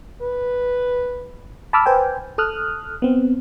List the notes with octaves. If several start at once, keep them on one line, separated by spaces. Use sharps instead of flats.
B4
A5 B5 D6 E6 F6
B4 C5 G5 G#5
A4 D#6 F6 F#6
B3 C4